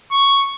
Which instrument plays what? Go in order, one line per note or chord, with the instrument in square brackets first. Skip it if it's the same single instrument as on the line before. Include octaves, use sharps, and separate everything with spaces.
[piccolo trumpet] C#6